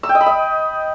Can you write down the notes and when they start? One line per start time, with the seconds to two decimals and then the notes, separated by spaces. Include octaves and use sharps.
0.03 E6
0.09 G5
0.15 D#5
0.21 B5
0.26 D#5